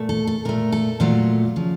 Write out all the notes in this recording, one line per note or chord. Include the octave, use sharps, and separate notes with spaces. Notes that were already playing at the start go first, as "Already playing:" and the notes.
Already playing: A#2 A3
A4
A4
A#2 A3 A#4
A4
A#2 F#3 A3 F4
C#3 F3